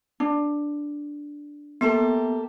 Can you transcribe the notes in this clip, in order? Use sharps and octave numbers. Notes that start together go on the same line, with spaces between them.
D4
A#3 B3 G4 A4